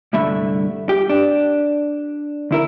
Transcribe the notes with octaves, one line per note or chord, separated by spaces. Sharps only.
C2 G2 D3 A3 E5 B5
G4
D4
D2 E4 A#4